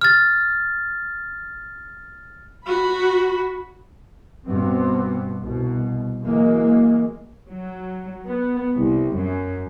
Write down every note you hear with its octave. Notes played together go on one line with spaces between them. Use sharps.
F6 A6
F#4 B5
G2 B2 B3 C4
C2 B2
E3 F#3 G#3 A#3
F#3
B3
C2
F#2